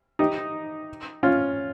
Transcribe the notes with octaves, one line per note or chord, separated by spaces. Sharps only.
D#4 G4
C#4 F4